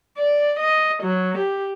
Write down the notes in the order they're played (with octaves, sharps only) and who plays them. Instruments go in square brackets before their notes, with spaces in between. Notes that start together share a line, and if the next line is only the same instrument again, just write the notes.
[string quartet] D5
D#5
F#3
G4